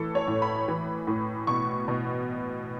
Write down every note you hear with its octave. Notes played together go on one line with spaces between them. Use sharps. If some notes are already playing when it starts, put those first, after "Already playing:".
Already playing: A2 E3 A4
C#5
A2
B5
E3
A2
B2 C#6
B2